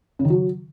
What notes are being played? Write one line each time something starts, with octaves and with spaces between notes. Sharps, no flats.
C#3
D#3
F#3